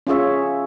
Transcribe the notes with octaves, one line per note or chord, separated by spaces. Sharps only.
C#4 F4 G#4 C#5 E5